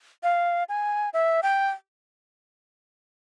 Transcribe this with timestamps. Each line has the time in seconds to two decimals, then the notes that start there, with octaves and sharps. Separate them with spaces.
0.23 F5
0.69 G#5
1.13 E5
1.43 G5